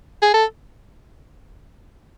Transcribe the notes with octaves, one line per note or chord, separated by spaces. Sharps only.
G#4
A4